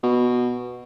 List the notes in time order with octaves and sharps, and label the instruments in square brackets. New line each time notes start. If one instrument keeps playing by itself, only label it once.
[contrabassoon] B2